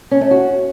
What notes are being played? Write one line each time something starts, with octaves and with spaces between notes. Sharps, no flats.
C#4
A3
F#4